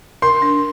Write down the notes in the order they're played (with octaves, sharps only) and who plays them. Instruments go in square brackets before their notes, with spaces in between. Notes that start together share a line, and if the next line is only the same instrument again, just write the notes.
[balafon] A#4 [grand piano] C6
[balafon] D4